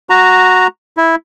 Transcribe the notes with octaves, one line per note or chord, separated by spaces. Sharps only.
F#4 A#5
E4